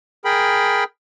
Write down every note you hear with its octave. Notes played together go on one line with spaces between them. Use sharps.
G#4 A#4 G5 B5